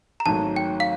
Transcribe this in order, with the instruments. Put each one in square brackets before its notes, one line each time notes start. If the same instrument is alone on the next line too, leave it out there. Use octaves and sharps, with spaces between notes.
[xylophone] A#5
[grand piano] G#1 G#2 D#3 F#3 A3 [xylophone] A5
[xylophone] G5
F5